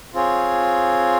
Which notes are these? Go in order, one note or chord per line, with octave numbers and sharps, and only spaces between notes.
C4 F4 G#4 C#5